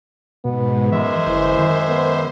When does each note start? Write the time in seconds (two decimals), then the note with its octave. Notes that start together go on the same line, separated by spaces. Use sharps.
0.45 G#2 B2 B3
0.92 F#2 E3 G#3 C5 E5
1.27 G1 E3
1.59 D#3
1.89 B3